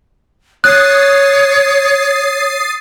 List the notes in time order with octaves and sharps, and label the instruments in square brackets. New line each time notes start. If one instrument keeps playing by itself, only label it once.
[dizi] C#5 [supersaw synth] D#6 A6 C7 [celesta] F#6